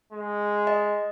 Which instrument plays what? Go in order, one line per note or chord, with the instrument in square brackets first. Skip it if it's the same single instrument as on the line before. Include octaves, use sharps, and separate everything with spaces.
[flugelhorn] G#3
[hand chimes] D#5